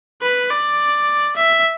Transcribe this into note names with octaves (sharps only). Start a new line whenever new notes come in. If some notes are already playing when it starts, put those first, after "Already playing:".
B4
D5
E5